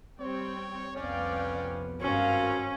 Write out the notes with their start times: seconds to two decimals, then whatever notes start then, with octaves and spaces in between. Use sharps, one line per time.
0.21 G3 C4 C#5 G5
0.96 C2 F2 B3 C#4 D5 F5 G5
2.01 G#1 G2 C4 C#4 F#4 A#4 F5